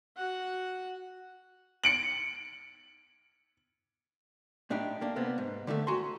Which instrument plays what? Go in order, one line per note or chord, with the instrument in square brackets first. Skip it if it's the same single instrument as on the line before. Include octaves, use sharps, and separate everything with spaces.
[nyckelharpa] F#4 F#5
[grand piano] C#7 D7 F#7
[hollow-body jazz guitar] A2 D4 D#4 G4
A#3 D4
C3 A#3 B3
G#2
D3 D#3 G#3 A3
F#4 G#5 A#5 C6